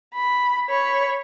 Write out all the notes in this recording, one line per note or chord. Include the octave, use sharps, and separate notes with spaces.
B5
C#5 B5